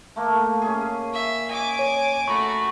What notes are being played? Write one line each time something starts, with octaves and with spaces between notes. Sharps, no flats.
A3 A#3
C#4 G#4
E5
D#5 G#5 D6
C#5
A3 F#4 A#5 B5 C#6